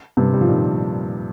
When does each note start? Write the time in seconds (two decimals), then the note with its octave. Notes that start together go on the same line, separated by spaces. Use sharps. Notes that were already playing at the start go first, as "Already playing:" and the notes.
0.17 G2 C3
0.33 G3
0.41 F3
0.49 A#2 D#3